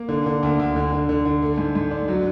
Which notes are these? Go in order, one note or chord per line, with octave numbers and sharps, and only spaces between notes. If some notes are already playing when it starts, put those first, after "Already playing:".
Already playing: A#3
D3
D3
D2
D2
D3
D3
D3
D3
A3
G#2
G#2
D4
F#3